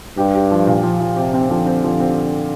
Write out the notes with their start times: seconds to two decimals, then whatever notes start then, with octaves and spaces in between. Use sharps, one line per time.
0.17 G2 G4
0.34 G4
0.51 F3
0.67 A#2
0.83 F3
1.00 F3
1.17 C3 G4
1.33 C4
1.50 D3 F3
1.66 C4
1.84 F3
2.00 C4